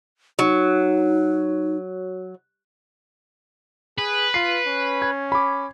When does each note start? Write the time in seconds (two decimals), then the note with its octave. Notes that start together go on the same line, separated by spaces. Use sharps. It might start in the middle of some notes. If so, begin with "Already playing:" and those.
0.39 F#3 D#4
3.98 G#4 B4
4.34 F4 C7
4.67 C#4
5.02 G#6
5.32 B5 D6